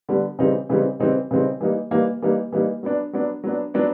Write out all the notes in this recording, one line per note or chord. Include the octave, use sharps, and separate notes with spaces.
D3 G3 B3
C#3 E3 G3 C4 D#4
C#3 E3 G3 C4 D#4
C#3 E3 G3 C4 D#4
C#3 E3 G3 C4 D#4
E3 G3 A#3 D#4
E3 G3 A#3 D#4
E3 G3 A#3 D#4
E3 G3 A#3 D#4
F#3 B3 D4
F#3 B3 D4
F#3 B3 D4
F#3 B3 D4